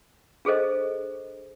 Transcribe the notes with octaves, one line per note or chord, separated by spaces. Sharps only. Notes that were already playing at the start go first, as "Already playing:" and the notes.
D4 G#4 A4 C5 D#5